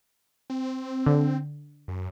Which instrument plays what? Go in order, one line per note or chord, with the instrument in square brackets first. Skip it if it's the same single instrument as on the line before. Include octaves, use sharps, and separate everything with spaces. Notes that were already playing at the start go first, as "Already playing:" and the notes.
[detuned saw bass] C4
[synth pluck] D3
[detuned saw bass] F#2